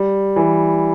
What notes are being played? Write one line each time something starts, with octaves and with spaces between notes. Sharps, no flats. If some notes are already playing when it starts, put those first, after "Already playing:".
Already playing: G3
E3